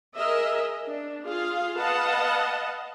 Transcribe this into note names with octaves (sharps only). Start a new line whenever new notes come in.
G#4 A#4 D#5 E5
D4
F4 G#4 F5
B4 D#5 F5 F#5 A5